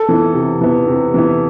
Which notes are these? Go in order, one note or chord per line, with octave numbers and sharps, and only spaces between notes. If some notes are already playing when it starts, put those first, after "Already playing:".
Already playing: A4
E3 B3
C3
E3 B3
C3
E3 B3